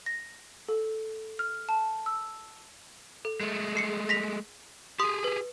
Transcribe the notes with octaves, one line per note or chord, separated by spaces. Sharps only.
A#6
A4
F6
A5
E6
A4
G#3 A3
G#4 C7 C#7
A#6 B6 F7
G4 G#4 C6 D#6
B4